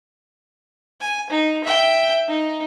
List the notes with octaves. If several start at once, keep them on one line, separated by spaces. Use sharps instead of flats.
G#5
D#4
E5 G5
D#4